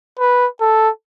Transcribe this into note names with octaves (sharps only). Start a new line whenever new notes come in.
B4
A4